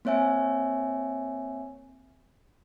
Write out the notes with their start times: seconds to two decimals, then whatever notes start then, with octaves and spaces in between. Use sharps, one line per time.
0.05 A#3 C4 C#5 E5 G#5